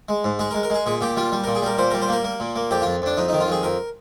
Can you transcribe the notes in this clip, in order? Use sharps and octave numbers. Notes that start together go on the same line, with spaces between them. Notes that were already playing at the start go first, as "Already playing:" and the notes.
G#3
G#2
G#3 G#4
A#4
G#3
A#4
G#3 G#4
A#2 G#4
A#2 G4
G3 F4
G3
A#2 A#4
G#4
G3 A#4
A#2 C5
G3 A#4
C5
A#3 A#4
A#3
A#2
A#3
F2 G4
F2 F4
F2 D4
F2 D#4
D#3 D#4
F4
F2 G#4
F2 A#4